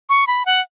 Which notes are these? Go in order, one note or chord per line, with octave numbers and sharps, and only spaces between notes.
C#6
B5
F#5